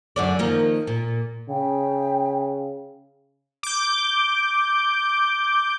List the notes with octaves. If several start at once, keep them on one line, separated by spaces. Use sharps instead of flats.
F#2 D3 D5
D#3 F3 A#3
A#2
C#3 G5
D6 G6